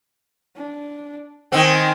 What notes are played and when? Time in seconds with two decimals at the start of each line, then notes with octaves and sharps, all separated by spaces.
0.56 D4
1.52 D#3 C4 G5 G#5